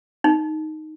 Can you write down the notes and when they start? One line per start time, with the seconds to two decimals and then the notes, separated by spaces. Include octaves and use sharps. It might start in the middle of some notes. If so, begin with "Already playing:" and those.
0.24 D#4